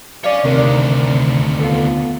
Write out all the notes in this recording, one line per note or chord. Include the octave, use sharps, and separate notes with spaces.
C#5 D5 F5 G#5
D2 C3 D#3 D4 A#4 D5
B3 F4 A4